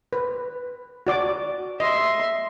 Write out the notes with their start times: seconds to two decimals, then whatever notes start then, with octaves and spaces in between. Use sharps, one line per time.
0.13 B4
1.07 F#4 D5 D6
1.80 D#5 E5 C6